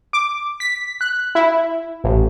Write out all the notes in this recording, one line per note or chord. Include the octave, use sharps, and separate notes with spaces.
D6
B6
F#6
E4
A1